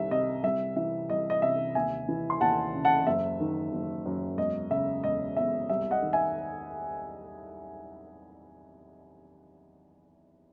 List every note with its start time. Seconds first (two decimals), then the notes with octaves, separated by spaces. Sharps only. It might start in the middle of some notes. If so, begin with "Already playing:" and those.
Already playing: C2 D#3 E5
0.11 C3 D#5
0.43 C2 E5
0.76 E3 E5
1.10 C2 D#5
1.30 D#5
1.42 C3 E5
1.75 D#2 E5 G#5
2.08 E3
2.30 C6
2.40 D#2 F#5 A5
2.74 C#3
2.85 F#5 A5
3.06 F#1 E5
3.40 D#3
3.72 F#1
4.06 F#2
4.37 E1 D#5
4.70 C#3 E5
5.03 E1 D#5
5.36 E2 E5
5.69 C2 E5
5.91 D#5 F#5
6.02 D#3
6.13 E5 G#5